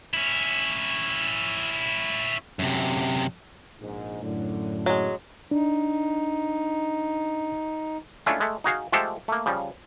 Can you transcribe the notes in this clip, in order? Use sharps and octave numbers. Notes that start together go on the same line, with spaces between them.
C#4 E4
F#2 C3
A#1 G#2
F#2 A2 D3
F#3 G#3
D4 D#4
G#3 A3 C#4 D4 E4 F4
G#3 A3
D#4 F#4 G#4 F5
F3 G#3 A3 G4 A4 C5
A3 A#3
C#3 F3 G3